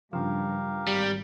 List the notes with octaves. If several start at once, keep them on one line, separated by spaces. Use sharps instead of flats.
G2 C#3 F3 G4 A#4 F5
G#1 G3